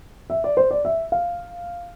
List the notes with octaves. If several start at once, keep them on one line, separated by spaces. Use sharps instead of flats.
E5
D5
C5
D5
E5
F5